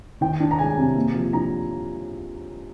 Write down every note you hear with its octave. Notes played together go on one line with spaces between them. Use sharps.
D#3 G5
D4
A#5
G#3 G#5
C3
A#3
F3
D4 A#5